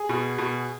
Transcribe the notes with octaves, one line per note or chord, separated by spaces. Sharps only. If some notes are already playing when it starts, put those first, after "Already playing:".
Already playing: G#4
B2
B2